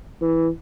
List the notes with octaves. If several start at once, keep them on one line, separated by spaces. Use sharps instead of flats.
E3